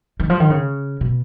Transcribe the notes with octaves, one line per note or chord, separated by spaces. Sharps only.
D#3
F3
D#3
C#3
B2